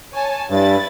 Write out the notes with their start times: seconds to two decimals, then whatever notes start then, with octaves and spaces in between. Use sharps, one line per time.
0.13 C#5 G#5 A5
0.50 G2 E4 B4 A6